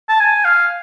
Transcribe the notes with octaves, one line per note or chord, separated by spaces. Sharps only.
A5
G#5
F5